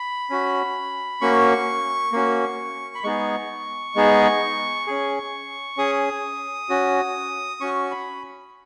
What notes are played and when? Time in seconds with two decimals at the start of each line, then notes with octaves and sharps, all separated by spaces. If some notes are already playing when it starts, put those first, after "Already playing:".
Already playing: B5
0.30 C#4 F#4
1.21 A#3 C#4 F#4 C#6
2.13 A#3 C#4 F#4
2.95 B5
3.04 G#3 B3 D#4 G#4 C#6
3.96 G#3 B3 D#4 G#4
4.87 C#4 G#4
5.77 C#4 G#4 D#6
6.69 C#4 F#4
7.61 C#4 F#4 C#6
7.91 B5